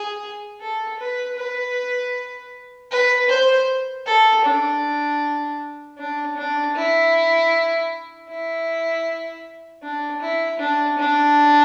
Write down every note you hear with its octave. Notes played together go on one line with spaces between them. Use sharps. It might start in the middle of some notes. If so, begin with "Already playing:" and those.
Already playing: G#4
A4
B4
B4
B4
C5
A4
D4
D4
D4
E4
E4
D4
E4
D4
D4